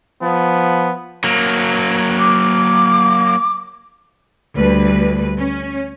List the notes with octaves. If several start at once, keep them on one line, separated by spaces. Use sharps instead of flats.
F3 B3
F#3 A#3
D6
D2 G3 B4
C#4